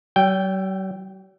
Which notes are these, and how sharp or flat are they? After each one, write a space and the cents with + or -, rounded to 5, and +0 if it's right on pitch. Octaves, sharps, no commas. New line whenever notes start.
F#3 +45 G5 +0